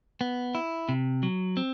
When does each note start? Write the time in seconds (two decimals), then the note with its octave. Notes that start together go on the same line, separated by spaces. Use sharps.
0.21 B3
0.55 E4
0.89 C3
1.23 F#3
1.57 C4